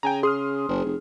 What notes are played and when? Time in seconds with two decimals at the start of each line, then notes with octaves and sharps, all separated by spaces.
0.03 C#3 G5 G#5 A#5
0.23 G#4 C6 D#6 F6
0.69 F#1
0.84 F1